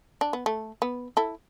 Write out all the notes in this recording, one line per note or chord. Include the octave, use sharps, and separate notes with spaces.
D4
B3
A3
B3
E4 A4